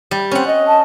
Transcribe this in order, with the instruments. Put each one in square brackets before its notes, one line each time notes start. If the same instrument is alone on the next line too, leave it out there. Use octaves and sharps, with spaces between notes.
[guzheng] G3
[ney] C4 [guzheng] C#4 F#5
[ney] D#5
[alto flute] A5